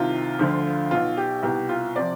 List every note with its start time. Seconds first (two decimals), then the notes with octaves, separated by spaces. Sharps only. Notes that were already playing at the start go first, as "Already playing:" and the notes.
Already playing: C2 C3 D#3 F4
0.39 D2 D3 F3
0.91 B1 B2 F4
1.17 G4
1.43 C2 B2 G4
1.69 F4
1.96 C3 F3 D5